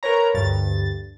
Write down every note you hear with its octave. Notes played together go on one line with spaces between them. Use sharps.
A#4 B4 C#5 A#5
D2 G2 A6